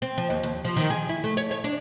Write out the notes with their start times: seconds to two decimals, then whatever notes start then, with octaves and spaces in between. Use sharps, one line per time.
0.02 C4
0.18 F3
0.30 D#2
0.43 D#2
0.65 F3
0.76 D#3
0.90 G#4
1.09 E4
1.24 A3
1.37 C#5
1.51 C#5
1.64 D4